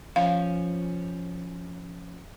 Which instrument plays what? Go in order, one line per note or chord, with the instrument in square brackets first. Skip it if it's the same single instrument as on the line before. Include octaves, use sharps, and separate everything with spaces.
[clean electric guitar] F3 C#4 [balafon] F5